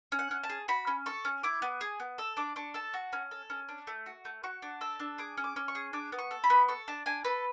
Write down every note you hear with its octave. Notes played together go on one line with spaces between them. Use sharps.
C#4
F#5
C#4
A5
G#4
F#4 B5
C#4
A4 C#6
C#4
E4 D6
B3
G#4
B3
A4 E6
D4 D6
D4 C#6
A4 A5
F#4
C#4
A4
C#4
D4
A3
F#4
A3
F#4 C#6
D4
A4 E6
D4
G#4 D6
C#4
D6
C#4
C#6
G#4
D4 D6
B3
C#6
A4
B5
B3
A4 C#6
D4 A5
D4 G#5
A4 B4